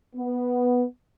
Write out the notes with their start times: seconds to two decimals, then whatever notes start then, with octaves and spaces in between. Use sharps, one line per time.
0.15 B3